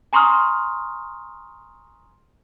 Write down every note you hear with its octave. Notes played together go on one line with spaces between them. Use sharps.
G#5 A#5 C6 C#6 D#6 F6